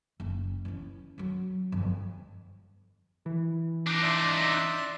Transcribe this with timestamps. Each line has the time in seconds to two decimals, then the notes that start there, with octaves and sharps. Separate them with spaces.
0.20 F#1
0.65 E3 C#4
1.18 F#2 F#3
1.72 G1 F2
3.26 E3
3.87 D4 D#4
4.02 D5 E5 C6